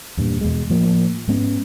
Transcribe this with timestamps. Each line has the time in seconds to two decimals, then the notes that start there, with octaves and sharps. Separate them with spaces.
0.17 E2 G2 A#2
0.41 E2 B2 G#3
0.70 A2 F3 A#3
1.28 G#2 G#3 B3 C#4